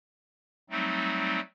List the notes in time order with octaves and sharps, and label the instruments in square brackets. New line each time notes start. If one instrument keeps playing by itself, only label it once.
[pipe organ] F#3 G3 A3 C4 D#4